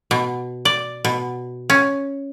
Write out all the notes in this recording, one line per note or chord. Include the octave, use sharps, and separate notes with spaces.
B2
D5
B2
C#4